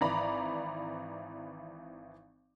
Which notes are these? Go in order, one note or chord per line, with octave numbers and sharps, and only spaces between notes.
G#1 E3 D5 A#5 B5